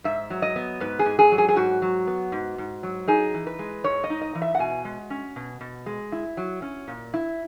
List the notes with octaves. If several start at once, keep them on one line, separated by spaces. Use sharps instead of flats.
G#2 E5
F#3
D#5
B3
G#2 B4
G#4
G#2
G#4
F#3
G#4
G#4
G#2 F#4
F#3
B3
G#2
G#2
F#3
D#4 G#4
E3
B4
G#3
G#2 C#5
D#5
D#4
D#5
E3
E5
F#5
B2 G#5
G#3
C#4
B2
B2
G#3
E4
F#3
C#4
A#2
E4